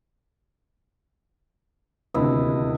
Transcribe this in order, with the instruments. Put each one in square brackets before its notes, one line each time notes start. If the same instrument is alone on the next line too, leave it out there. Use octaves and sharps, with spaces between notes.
[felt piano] D#1 D2 C3 [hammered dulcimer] E4 D#5